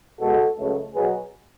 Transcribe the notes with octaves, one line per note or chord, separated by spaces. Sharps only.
B2 G#3 B3 F#4 A4
C#2 C#3 F#3 A3
B2 F#3 B3 G#4 B4